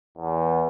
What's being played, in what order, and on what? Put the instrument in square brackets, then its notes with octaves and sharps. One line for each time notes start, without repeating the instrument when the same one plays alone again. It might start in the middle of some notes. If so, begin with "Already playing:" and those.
[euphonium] E2